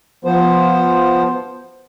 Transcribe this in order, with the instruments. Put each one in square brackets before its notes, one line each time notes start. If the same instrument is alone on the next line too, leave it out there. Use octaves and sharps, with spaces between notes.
[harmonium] F3 B3 C5